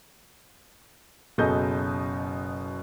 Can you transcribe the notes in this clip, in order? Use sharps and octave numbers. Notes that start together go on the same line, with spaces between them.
F#1 B2 G#4 A4 D#5 G6